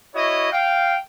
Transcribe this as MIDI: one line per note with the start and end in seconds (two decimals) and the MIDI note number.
0.14 0.51 64
0.14 0.51 66
0.14 0.51 73
0.14 0.51 75
0.52 0.96 77
0.52 0.96 79